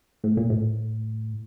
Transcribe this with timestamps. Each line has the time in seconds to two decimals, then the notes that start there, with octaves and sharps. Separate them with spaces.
0.24 A2
0.37 A#2
0.50 A2